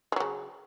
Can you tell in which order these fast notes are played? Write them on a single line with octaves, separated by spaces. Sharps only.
G#3 F#3 C#3